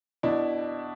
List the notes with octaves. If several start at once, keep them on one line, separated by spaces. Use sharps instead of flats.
B2 D4 E4